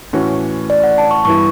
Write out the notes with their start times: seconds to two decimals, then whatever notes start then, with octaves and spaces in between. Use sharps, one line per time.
0.13 A2 E3 A3 C#4 F#4
0.70 D5
0.84 F#5
0.98 A5
1.11 C#6
1.25 G2 E3 B3 E4 C#6